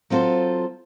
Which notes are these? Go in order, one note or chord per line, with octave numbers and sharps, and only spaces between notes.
F#3 C4 F4 A4 C5